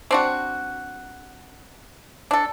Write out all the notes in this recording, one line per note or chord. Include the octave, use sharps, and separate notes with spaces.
C4 D4 F#4
D4 A4